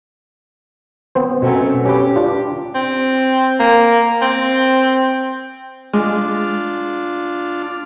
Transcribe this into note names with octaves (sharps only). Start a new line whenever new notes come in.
B3 C4 C5
F#2 B2 A3 C4
C#4 G4 B4
D4 F4
C4
A#3
C4
G#3 D4 F4